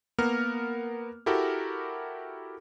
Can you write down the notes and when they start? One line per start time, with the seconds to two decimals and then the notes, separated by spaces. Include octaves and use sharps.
0.18 A#3 B3 A#4 F6
1.26 E4 F#4 G4 A4 A#4